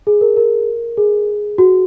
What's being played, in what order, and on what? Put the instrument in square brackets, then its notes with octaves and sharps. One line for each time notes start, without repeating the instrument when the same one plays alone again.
[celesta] G#4
A#4
A#4
G#4
F#4